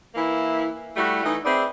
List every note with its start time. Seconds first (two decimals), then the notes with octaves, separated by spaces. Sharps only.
0.15 E3 A#3 E4
0.96 G3 A3 E4 F#4
1.23 E3 A3 D#4
1.45 C4 G#4 B4 D5 E5